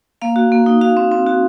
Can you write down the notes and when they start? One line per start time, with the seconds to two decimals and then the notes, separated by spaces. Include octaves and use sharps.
0.22 A#3 F5
0.36 F#4
0.52 A#3
0.66 D#4
0.81 F#4 F5
0.97 C4
1.11 C4
1.26 F#4